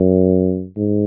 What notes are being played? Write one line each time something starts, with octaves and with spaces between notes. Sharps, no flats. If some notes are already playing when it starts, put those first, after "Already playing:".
Already playing: F#2
G#2